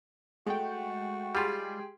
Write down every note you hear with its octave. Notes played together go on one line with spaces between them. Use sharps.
G#3 A3 F#4 G5
G3 F4 G4 G#4 C6